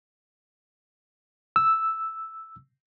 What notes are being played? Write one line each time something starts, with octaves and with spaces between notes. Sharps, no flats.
E6